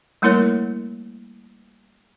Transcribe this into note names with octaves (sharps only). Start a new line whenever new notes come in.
G3 A3 A#3 E4 A#4 C#5